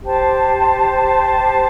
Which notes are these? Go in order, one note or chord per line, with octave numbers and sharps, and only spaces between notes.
G4 C5 A5